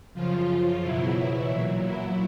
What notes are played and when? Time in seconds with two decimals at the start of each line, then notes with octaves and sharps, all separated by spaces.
0.13 F#2 C#3 F3 F4
0.47 F4
0.81 E2 B2 F#3 E4
1.49 A#2 F#3
1.83 E4